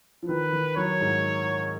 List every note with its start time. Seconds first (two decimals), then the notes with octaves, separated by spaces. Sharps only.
0.23 F3
0.29 D#3 B4
0.53 D#3
0.77 F#3 C#5
1.01 G#2